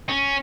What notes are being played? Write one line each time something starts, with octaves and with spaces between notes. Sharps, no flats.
C#4